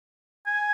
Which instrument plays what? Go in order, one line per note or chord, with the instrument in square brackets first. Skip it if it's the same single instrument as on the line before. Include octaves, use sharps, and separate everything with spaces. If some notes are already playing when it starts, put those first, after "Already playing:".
[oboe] G#5